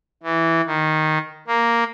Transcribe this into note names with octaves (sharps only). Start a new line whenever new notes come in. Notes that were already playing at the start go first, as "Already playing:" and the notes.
E3
D#3
A#3